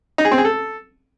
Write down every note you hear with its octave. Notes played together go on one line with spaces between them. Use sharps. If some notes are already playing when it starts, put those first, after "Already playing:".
D#4
G#4
C4
G#4
A4